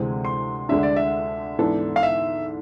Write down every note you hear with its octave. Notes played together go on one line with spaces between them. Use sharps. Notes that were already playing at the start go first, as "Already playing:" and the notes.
Already playing: D2 C3 E3 G#3 C4
C6
D2 D3 G#3 D4 E5
D5
E5
G#2 E3 B3 D4 A4
F5
E5